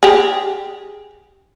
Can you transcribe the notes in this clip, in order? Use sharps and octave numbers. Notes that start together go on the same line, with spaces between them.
G4 G#4